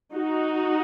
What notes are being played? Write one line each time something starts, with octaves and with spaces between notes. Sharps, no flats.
D#4 F#4